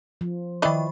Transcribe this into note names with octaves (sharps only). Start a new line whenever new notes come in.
F3
D#3 E3 D5 D#5 B5